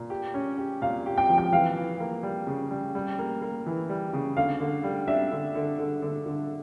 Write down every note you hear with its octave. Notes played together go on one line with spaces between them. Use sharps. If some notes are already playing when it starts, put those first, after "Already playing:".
Already playing: A#2
G4
C#4
G4
A#2 F5
G4
G5
F3
G5
E3 F5
E3
A#3
G3
C#3
G3
G3
A#3
A#3
E3
G3
C#3
D3 F5
D3
G3
D4 E5
D3
D3
D3
D3
D3